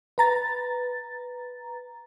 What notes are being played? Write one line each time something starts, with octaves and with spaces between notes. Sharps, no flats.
B4 A#5 A6